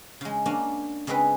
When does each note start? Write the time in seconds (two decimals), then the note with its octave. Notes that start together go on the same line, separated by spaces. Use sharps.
0.21 C#3 G#3
0.46 A#3 C#4 D4
1.07 C#3 G#3 C4 G#4 B4